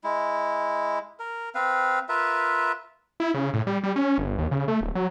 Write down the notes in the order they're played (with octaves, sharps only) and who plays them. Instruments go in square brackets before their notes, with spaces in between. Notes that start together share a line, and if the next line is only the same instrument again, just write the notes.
[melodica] G#3 E4
A#4
C4 B4 F5
F4 A#4 B4 E5
[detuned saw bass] E4
C#3
A2
G3
G3
C#4
G1
D#2
C#3
A3
D1
F#3